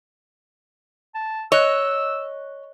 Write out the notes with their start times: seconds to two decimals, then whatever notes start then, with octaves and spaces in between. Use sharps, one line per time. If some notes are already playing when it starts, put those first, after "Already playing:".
1.15 A5
1.52 C#5 D#5 E6 F#6